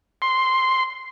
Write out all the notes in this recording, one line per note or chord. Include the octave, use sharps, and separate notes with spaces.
C6